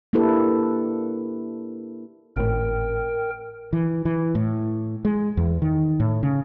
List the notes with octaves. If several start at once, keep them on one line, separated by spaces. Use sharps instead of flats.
A#3 D4 E4 G4 A4 B4
G#1 A2 A#4 G5
E3
E3
A2
G#3
E2
D#3
A2
C#3